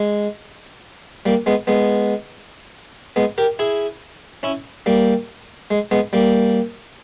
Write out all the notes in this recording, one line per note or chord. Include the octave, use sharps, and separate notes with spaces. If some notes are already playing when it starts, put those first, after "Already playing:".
Already playing: G#3
G3 A#3
G#3 B3
G#3 B3
G#3 B3
G4 A#4
E4 G#4
C#4 E4
G3 A#3
G#3
G#3 B3
G3 A#3